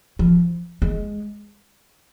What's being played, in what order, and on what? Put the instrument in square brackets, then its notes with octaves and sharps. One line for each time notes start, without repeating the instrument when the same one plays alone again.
[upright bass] F3
G#3